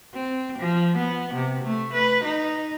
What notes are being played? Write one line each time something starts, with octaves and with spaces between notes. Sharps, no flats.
C4
F3
B3
C3
A3
B4
D#4